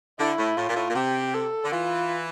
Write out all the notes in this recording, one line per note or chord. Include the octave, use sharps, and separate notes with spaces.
D3 E4
A2
A2 F4
A#2
A2
A#2
C3 G4
A4
D3
E3 F4